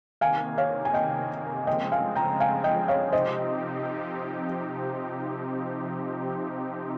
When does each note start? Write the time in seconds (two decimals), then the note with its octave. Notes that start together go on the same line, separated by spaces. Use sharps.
0.21 C3 D#3 A#3 F5 G#5
0.58 C#5 F5
0.85 G#5
0.94 D#5 G5
1.67 C#3 F3 G#3 C4 D#5 G5
1.92 F5 G#5
2.15 G5 A#5
2.40 F5 G#5
2.64 D#5 G5
2.88 C#5 F5
3.12 C3 F3 C4 D#4 G4 C5 D#5